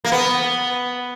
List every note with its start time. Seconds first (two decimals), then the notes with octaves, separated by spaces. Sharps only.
0.05 A#3
0.12 B3